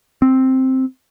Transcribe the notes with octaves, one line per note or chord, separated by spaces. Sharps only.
C4